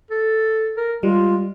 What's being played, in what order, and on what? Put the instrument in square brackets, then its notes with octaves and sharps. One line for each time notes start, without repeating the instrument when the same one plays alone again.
[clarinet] A4
A#4
[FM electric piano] G3 [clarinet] G#3 [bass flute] F4